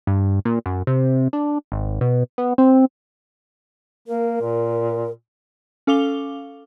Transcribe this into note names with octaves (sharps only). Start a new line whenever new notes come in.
G2
A#2
F#2
C3
D4
G#1
B2
B3
C4
A#3 A#4
A#2
C#4 A4 F5 D6 F7 G7